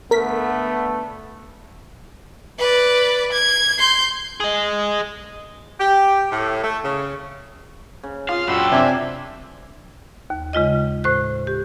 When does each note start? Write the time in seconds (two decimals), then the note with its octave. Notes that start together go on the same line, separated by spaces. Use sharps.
0.11 D3 A3 B3 A#4 B6
2.59 B4 D5
3.32 G#6
3.79 C6 G6
4.40 G#4 D#5
5.80 G4
6.31 A2
6.64 A3
6.85 C#3
8.03 C#3
8.29 F4 F5 C6 D#6
8.48 F#2 D4 F#4 A4 E5 G5 B5 C6
8.72 C3 D4 A#4 C5 D5 E5 G#5
10.30 D#2
10.53 C#3 G#3 F4 D#5
11.04 A2 C5 F#6
11.47 G4